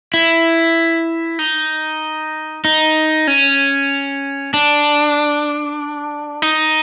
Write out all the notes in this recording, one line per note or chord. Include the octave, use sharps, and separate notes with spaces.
E4
D#4
D#4
C#4
D4
D#4